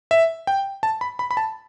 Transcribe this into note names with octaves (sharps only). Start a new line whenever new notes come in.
E5
G5
A5
B5
B5
B5
A5